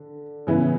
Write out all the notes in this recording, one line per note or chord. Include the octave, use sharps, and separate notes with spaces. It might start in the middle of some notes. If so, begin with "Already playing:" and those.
Already playing: D3
C#3 E3 B3 E4